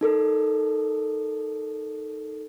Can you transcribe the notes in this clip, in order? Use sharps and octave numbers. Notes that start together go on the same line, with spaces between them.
D#4 A4 A#4